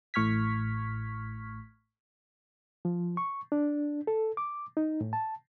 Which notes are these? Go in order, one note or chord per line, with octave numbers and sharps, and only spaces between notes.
A1 A2 C#6 F6 G#6 B6
F3
C#6
D4
A4
D6
D#4
A2
A5